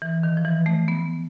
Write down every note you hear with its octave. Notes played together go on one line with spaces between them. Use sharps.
E3
D#3
F3
E3
A3
B3